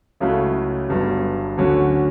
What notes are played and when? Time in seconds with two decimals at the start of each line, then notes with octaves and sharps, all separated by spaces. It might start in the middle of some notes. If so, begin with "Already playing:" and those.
0.20 C#2 C#3 F#3 A3 E4
0.89 G1 G2 F#3 B3
1.57 D2 D3 F#3 C#4